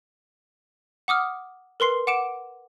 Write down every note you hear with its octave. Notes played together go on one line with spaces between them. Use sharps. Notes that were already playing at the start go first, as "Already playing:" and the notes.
F#5 D6 D#6 F6
A#4 B4 C6 C7
F#5 D6 D7 E7